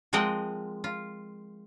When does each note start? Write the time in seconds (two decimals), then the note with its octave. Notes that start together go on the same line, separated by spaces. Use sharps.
0.13 F3 G#3 C4 A#4 D#5 F#5
0.84 F4